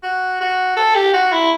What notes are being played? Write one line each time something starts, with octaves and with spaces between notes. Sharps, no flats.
F#4
F#4
A4
G4
F#4
E4